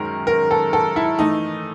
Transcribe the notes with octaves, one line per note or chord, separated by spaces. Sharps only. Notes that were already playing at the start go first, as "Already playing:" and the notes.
Already playing: F#2 D#3 G#3 A#4
A#4
A4
A4
E4
E3 A3 D#4